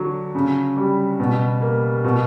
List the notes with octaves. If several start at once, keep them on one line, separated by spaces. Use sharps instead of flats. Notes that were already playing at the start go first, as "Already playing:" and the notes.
Already playing: D3 F#3
C#3
G3
B2
A#3
B2